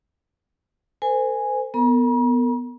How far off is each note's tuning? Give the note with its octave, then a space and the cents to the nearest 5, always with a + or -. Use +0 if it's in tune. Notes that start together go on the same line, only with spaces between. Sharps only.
A4 +45 C5 -30 G#5 -5
B3 +0 A#4 -40 A#5 +45